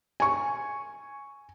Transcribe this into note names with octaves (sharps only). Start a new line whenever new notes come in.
G#5 C#6